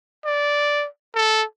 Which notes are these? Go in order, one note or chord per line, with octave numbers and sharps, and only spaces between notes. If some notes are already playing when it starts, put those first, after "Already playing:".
D5
A4